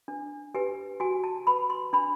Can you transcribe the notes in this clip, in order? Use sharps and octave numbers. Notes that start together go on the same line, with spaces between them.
D4
G4 B4 G#5
F#4 G#5
A5
B4 B5
C6
D4 B5